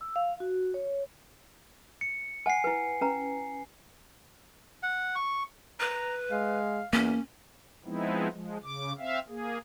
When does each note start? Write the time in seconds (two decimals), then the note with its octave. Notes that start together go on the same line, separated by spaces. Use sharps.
0.01 E6
0.16 F5
0.40 F#4
0.74 C#5
2.01 C#7
2.46 C5 F#5 G#5 C7
2.64 E4 B4
3.01 C#4 B4 A#5
4.83 F#5
5.16 C#6
5.80 B4 A#5
6.31 G#3 F5
6.93 E2 A#3 C#4
7.86 F3 G#3 B3 C4 D#4 E4
8.32 F3 G#3
8.63 C#3 D6
8.98 C4 E5 F5
9.28 A#3 G#4